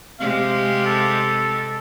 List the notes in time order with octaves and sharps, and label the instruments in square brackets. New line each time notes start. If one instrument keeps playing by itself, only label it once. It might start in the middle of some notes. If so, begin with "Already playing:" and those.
[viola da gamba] C3 G#3 G4 [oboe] F5
[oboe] A4